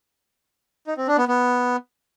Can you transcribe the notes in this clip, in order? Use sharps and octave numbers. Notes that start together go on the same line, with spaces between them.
D#4
C4
D4
B3
B3